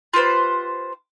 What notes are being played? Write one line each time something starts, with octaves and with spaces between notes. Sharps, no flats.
F4 G4 B4 C5